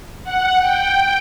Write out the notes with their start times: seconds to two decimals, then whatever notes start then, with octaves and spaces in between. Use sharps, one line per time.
0.24 F#5
0.59 G5